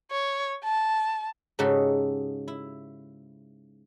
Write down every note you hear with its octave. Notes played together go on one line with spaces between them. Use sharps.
C#5
A5
G#2 C#3 D#4 F#4 G4 A4
E4